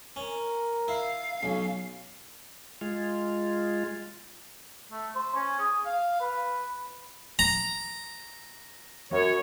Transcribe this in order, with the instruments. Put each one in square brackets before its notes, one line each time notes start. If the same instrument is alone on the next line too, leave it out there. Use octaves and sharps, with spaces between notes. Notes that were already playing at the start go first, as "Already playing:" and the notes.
[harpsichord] C#4 [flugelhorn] A#4
[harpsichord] E4 [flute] F5
[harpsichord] B1 [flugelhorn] C#4
[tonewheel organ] G#3 F4
[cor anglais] A3
C5
C#4
G#4
F5
B4
[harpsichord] A#5
[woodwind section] F#2 C#5